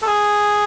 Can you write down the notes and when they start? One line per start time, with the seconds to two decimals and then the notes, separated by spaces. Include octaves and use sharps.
0.03 A4
0.07 G#4